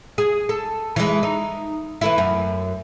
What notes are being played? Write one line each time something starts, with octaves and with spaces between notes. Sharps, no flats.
G#4
A4
E3 G#3
D#4
E3 A3 E4
F#2